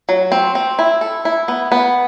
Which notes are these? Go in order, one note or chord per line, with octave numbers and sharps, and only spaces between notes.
F#3
C4
C4
E4
A4
E4
B3
B3